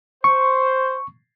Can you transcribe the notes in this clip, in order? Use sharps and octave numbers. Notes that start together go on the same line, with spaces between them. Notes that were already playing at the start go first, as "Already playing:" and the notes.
C5 C#6